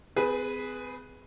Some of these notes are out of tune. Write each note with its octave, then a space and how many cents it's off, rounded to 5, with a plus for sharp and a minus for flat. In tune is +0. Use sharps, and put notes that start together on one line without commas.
C4 -45 G#4 +0 B4 -5